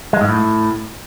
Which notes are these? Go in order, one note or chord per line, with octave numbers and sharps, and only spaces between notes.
G#3
G#2
A2